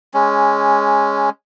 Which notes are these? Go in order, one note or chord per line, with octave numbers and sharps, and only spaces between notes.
G#3 C#4